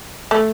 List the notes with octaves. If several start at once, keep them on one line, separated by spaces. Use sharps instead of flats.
A3